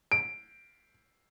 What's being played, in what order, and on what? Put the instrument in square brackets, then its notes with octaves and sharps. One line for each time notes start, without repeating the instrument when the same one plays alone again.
[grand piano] D7